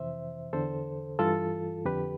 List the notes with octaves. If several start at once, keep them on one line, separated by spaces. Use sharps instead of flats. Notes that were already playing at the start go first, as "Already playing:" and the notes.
Already playing: F2 C3 E3 C5 E5
E2 D3 A4 C5
G2 E3 F4 A4
F2 D3 G4 B4